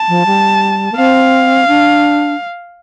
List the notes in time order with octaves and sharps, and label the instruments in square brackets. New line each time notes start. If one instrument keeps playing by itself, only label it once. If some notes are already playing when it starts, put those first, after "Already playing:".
Already playing: [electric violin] A5
[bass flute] F3
G3
A#3
[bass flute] C4 [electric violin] F5
[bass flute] D4